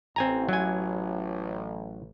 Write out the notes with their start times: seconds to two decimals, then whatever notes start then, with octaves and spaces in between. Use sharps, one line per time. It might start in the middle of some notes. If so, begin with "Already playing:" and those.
0.16 A1 C4 G#5 A#5
0.49 F#3 G#5